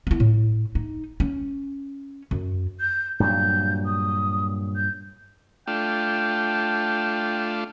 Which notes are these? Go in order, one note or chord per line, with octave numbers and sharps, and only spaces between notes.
B3 E4
A2
D#4
C#4
F#2
G6
G2 A#2 F#3 G6
D#6
G6
A3 D4 F4 G5